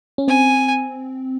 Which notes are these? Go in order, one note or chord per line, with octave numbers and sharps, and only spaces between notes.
C#4
C4 G#5